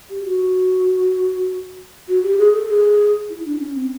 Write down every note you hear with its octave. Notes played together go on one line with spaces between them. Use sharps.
G4
F#4
F#4
G4
G#4
A4
G#4
E4
D4
C#4
C4